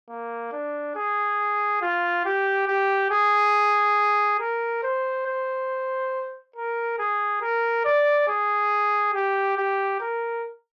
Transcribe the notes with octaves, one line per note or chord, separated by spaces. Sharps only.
A#3
D4
G#4
F4
G4
G4
G#4
A#4
C5
C5
A#4
G#4
A#4
D5
G#4
G4
G4
A#4